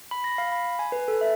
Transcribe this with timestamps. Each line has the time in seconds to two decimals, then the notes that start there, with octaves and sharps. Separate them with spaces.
0.11 B5
0.24 A#6
0.38 F5
0.52 B5
0.79 G#5
0.92 B4
1.08 A4
1.21 E5